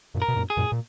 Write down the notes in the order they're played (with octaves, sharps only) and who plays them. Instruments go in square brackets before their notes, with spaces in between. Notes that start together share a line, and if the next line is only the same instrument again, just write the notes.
[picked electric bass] F#2 A#2
[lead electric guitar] A#4
[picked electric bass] B2
F#2 A#2
[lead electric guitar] G#4
[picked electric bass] F#2 A#2
A#2